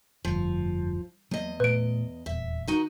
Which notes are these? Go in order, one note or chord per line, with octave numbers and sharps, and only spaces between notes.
F1 D2 G2 F3
E2 F#3 A#3 D#5
A#2 A3 B4 D7
D#1 E2 E5
D#3 D#4 F#4